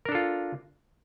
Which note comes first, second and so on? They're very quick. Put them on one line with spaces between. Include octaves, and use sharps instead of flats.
A#4 D4 A4 F4